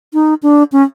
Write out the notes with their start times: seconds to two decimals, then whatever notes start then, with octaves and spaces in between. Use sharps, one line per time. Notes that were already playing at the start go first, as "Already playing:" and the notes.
0.14 D#4
0.43 D4
0.72 C#4